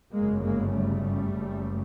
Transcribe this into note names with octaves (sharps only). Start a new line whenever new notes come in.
G1 F#2 C#3 G#3 A#3
G#3 A#3
G3 A3
F#1 F#2 C#3